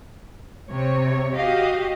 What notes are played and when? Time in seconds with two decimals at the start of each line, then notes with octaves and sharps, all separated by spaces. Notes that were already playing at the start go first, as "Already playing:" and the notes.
0.70 C3 C#5
1.34 F#4 G4 D#5 F5